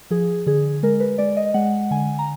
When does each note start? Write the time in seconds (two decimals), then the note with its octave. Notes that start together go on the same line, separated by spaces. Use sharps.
0.11 F3 G#4
0.46 D3 G#4
0.83 G#3 A#4
1.00 B4
1.18 G#3 D5
1.37 D#5
1.54 G#3 F#5
1.91 D3 G#5
2.19 A#5